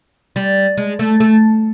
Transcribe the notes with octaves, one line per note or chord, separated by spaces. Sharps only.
G3
G#3
A3
A3